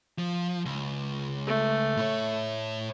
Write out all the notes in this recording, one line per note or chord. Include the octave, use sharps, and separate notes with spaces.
F3
C#2
A3
A2 C#5